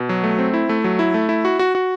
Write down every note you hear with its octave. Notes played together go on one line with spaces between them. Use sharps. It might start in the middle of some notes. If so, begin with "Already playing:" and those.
Already playing: B2
F#3
A3
C4
E4
A3
F#3
E4
A3
E4
F#4
F#4
F#4